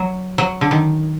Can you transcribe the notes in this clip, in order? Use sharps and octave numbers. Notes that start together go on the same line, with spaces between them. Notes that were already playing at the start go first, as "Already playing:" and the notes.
Already playing: F#3
F#3
D3
D#3